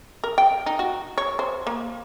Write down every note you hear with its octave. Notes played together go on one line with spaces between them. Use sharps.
A#4
G5
D#4
F#4
C#5
C5
A#3